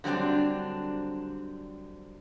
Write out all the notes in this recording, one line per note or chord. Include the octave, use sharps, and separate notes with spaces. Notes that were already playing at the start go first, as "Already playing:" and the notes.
D3 F#3 G3 C4 D4